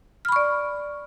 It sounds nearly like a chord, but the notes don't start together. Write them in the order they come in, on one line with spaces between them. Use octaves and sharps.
F6 B5 C#6 D5